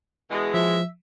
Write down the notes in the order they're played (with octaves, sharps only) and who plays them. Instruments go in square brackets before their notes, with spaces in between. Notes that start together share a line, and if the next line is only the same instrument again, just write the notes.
[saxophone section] B2 E3 G#3
[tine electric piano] F3 [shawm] E5